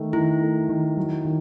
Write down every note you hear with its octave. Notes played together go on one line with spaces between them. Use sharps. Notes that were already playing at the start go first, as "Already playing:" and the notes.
Already playing: D#3 A3
D#3 E4
A3
D#3
F#3
D#3